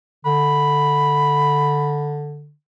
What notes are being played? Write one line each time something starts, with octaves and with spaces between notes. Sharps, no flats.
D3 B5